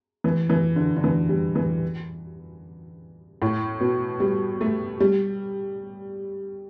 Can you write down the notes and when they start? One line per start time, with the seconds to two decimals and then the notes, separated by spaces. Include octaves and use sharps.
0.24 E3
0.50 E3
0.76 D3
0.97 D3
1.04 E3
1.29 G3
1.55 E3
3.42 A2
3.80 B2
4.20 G3
4.61 A3
5.00 G3